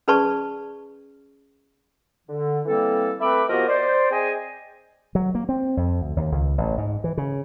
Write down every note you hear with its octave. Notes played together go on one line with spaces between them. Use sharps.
C#4 G#4 B4 D5 A5 C#6
D3
E3 G3 A#3 C4 A4
A3 C4 B4 E5 B5 D6
F3 B3 F#4 G4 A#4 D#5
C5 D5
C4 G#4 D#5 G5 G#5
F#3
A#3
C4
F2
D2
D#2
C#2
A1
G#2
E3
C#3